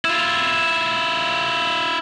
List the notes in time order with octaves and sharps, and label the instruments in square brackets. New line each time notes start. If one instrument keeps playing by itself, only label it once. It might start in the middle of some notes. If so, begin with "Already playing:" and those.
[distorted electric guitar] E4 F4